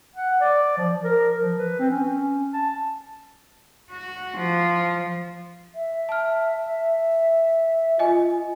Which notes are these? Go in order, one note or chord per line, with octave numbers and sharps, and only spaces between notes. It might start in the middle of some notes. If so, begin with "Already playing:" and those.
F#5
D5
F3
A#4
F3
B4
C4
C#4
A5
F#4
F3
E5
A5 F6
F4 D#5 G#5